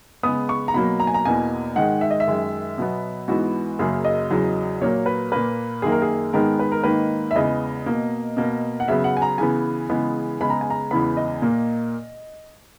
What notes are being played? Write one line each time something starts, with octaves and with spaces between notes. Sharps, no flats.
C#3 G#3 B3 D#6
C#6
A#5
B2 F#3 A#3 B5
A#5
G#5
A#5
E2 B2 A#3 G#5
G#2 D#3 G#3 F#5
E5
D#5
E5
F#2 D#3 G#3
B2 F#3 B3
G#2 E3 B3 F#4
F#2 C#3 F#3 A#3 G#4
D#5
E2 C#3 F#3
A#2 F#3 A#3 C#5
B4
A#2 A#3 B4
F#2 D#3 A#3 G#4
A#4
G#4
G#2 D#3 G#3 B3 A#4
B4
A#4
G#2 D#3 A#3 B4
E5
E2 C#3 G#3 B3 D#5
B2 A#3
B2 A#3
F#5
C#3 F#3 B3 E5
F#5
G#5
A#5
C#3 E3 B3 G#5
C#3 E3 G#3 B3
C#3 G#3 B3 B5
A#5
G#5
A#5
E2 C#3 E3 G#3 B3 B5
D#5
A#2 A#3